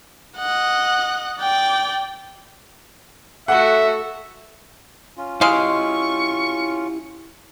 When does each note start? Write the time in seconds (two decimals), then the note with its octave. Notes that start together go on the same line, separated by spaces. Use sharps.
0.38 D#5 F#5
1.40 D5 G5
3.48 A3 F#4 A4 E5 F#5
5.17 C#4 F4
5.41 G#3 E4 G4 F5 C#6